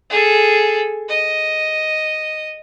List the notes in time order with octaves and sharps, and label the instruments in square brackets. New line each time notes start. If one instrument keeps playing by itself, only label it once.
[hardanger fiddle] G#4 A4
D#5